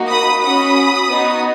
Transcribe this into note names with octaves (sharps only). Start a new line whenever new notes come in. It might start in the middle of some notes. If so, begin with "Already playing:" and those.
Already playing: A#3 D#4 F#4
B5 D#6
C#4 F#4 B5 D#6
B3 D#4 F#4